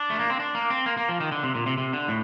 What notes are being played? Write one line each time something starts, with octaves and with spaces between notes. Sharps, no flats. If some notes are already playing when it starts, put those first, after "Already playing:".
Already playing: D4
A3
A#3
C4
D4
A#3
C4
A#3
A#3
F3
D#3
D3
C3
A#2
C3
C3
D3
A2